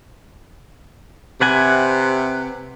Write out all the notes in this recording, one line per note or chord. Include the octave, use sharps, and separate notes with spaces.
C3 B4 F#5 G#5